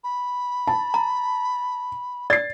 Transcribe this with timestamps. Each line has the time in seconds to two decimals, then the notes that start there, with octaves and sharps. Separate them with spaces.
0.04 B5
0.67 A5
0.94 A#5
2.30 D5 A6 C7